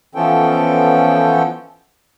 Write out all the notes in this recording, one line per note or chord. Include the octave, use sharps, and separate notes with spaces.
E3 F3 B3 C#4 A4 G5